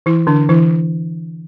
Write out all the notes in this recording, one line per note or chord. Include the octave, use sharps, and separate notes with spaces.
E3 E4
D3 D4
E3 E4